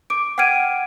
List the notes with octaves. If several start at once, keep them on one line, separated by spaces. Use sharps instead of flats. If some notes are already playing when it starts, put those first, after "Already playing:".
D6 D7
F#5 G5 F6 G#6 D7 D#7